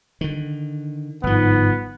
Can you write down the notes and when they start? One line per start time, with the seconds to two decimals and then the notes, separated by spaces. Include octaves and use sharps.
0.21 D3 D#3
1.23 G1 G#2 F3 B3